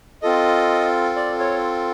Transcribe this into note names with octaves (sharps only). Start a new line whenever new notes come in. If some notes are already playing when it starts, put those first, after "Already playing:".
C4 F4 A4 D#5
D5
C#5